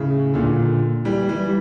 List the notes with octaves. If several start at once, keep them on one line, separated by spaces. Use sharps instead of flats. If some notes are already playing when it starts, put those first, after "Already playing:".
Already playing: A2 C#3
A#2 D3
E3 G3
E3 G3